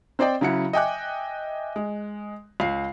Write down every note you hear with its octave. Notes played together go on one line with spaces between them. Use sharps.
C4 C5 D5 D#5 G5
C#3 F#3 E4 F#5 C#7
D#5 E5 G5 G#5 D6 F#6
G#3
C#2 F5 C7